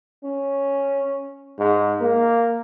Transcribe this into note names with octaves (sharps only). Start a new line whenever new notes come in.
C#4
G#2
A#3